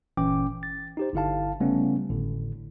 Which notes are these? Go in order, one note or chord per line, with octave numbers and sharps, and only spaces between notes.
G1 A#2 E3 C#4 G5 D6
A6
D#4 G4 C5
G1 D3 E4 F5 A5
C#3 G3 A3 B3 C#4
G#1 A2 D3